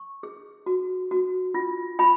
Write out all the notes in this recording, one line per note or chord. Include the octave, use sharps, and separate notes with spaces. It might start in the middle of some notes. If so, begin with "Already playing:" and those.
Already playing: C#6
G#4
F#4
F#4
F4
F4 G#5 B5